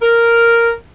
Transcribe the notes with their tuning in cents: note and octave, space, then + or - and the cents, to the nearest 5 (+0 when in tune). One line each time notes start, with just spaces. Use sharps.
A#4 -5